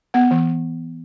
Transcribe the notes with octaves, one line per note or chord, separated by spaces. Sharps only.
B3 F#5
E3